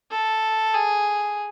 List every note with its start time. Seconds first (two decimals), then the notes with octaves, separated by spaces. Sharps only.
0.12 A4
0.74 G#4